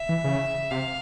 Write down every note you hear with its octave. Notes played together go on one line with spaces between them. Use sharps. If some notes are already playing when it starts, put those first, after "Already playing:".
Already playing: E5
E3
C#3
C3 F5